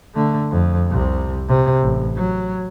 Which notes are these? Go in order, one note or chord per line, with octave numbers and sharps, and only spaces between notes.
D3 A3
F2
C2 C3
C3
A1
F#3